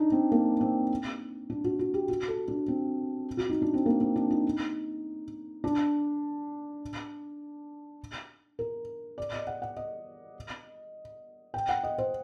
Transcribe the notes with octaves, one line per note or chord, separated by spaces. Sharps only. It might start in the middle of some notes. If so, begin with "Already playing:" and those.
Already playing: D4 D#4
C4
A#3
C4
D4
F#4
F#4
G4
F#4
A4
D4
C4
F#4
D#4
D4
C4
A#3
C4
D4
D#4
D4
A#4
D5
D#5
F#5
F#5
D#5
G5
F#5
D#5
C5